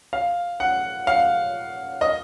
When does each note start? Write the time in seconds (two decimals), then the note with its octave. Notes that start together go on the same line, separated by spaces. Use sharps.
0.13 F5
0.60 F#5
1.07 F5
2.01 D#5